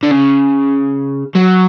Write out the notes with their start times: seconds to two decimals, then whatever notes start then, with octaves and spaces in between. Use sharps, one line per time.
0.03 D3
0.11 C#3
1.35 F#3